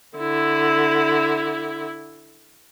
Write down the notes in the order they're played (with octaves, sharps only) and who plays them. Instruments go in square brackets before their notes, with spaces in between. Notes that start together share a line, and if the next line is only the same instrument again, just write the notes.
[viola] D3 E4